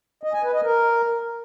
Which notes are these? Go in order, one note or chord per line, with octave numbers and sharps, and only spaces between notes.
D#5
G#5
B4
D#5
A#4